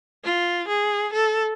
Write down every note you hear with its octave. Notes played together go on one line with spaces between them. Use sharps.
F4
G#4
A4